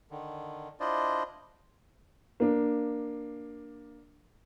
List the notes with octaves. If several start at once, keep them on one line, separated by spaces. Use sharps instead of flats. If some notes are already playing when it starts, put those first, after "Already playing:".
D3 D#3
D4 E4 F4 C5 D5 D#5
A#3 D4